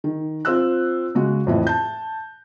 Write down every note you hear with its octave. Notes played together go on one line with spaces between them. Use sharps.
D#3
C4 F4 E6 F#6
C#3 G#3 F#4
F2 A2 E3
A5 G6